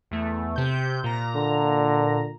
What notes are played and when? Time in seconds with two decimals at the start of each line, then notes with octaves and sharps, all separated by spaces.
0.11 E2 A3
0.56 C3 G6
1.04 A#2 A#5
1.35 D3